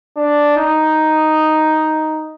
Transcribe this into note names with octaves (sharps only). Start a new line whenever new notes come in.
D4
D#4